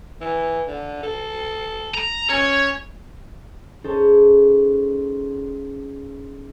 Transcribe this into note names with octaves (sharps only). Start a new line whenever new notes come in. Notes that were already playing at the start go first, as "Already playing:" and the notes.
E3
D3
A4
A#5
C#4 C#5
C#4 D#4 G#4 A4 C5